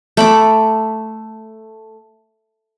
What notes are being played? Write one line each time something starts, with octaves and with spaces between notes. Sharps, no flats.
A3 B5 D6